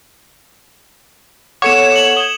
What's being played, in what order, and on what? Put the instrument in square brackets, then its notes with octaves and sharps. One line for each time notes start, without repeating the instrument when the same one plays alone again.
[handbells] B3 A4 F#5 [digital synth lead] C#5 [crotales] D6 C#7 E7
[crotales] D6 C#7 F#7
[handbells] D#6 G#6 [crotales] G7